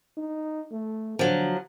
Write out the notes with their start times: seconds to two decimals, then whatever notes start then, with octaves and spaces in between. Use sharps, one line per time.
0.17 D#4
0.72 A3
1.19 D3 F3 F#3